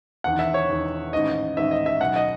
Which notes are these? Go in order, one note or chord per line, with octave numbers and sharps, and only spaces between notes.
E1 E2 D#3 F#5
E5
C#5
E1 E2 D#3
A1 G#2 D#3 D#5
A1 G#2 D#3 E5
D#5
E5
B1 B2 F#5
D#5